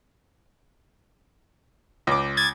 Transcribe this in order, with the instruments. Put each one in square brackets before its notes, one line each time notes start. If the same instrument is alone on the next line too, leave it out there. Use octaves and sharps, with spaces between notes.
[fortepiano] C#2 D6
[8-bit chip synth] G#6 A6